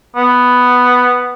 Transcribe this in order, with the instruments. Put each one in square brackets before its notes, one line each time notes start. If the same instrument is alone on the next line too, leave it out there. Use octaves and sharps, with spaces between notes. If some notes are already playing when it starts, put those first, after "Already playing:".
[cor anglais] B3